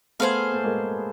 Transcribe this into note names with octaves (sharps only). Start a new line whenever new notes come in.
A3 B3 G#4 C5 F5
A3
G#3 A#3